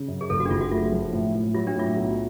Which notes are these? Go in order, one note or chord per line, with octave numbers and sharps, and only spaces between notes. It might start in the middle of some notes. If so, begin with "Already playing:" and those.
Already playing: C#3
F#2
G#4
F#1 A4
F#4
D4
F#1 F4
F#4
A3 F4
F3
A2
A2
F#3 F4
D4
A2 F4
B1